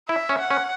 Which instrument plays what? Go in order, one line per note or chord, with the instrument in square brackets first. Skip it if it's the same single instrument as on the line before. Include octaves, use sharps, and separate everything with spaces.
[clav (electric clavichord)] E4 [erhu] E5
[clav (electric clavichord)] C#4
[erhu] F#5
[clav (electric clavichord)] C#4